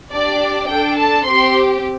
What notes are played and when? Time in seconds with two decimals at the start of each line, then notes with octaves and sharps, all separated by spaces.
0.11 D4 G4 D5
0.68 D4 A4 G5
0.97 A5
1.24 C4 G4 C6